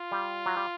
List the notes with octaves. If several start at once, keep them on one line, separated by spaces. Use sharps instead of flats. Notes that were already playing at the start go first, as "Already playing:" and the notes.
Already playing: F4
G3
F#3
G3